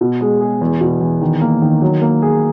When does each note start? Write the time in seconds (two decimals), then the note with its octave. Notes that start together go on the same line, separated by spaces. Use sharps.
0.01 B2
0.21 G#3
0.41 G#4
0.61 E2
0.81 B2
1.01 E2
1.21 D#3
1.41 A#3
1.62 D#3
1.82 F#3
2.02 A#3
2.22 G#4